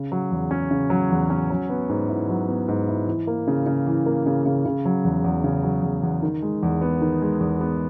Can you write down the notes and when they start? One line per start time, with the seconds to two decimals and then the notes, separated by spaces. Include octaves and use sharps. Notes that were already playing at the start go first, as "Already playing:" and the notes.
Already playing: C#3
0.12 F#3
0.31 E2
0.51 C#4
0.71 C#3
0.90 F#3
1.10 E2
1.30 C#4
1.50 F#3
1.69 B3
1.89 G#2
2.09 E4
2.29 F#3
2.48 B3
2.68 G#2
2.88 E4
3.07 E3
3.27 A#3
3.47 C#3
3.66 C#3
3.87 E3
4.06 A#3
4.26 C#3
4.46 C#3
4.66 C#3
4.85 F#3
5.04 E2
5.24 E2
5.44 C#3
5.63 F#3
5.83 E2
6.03 E2
6.22 D#3
6.42 G#3
6.63 E2
6.81 B3
7.01 D#3
7.22 G#3
7.41 E2
7.61 B3